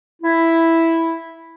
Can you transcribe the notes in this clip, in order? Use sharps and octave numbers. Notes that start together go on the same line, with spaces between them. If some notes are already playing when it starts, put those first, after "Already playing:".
E4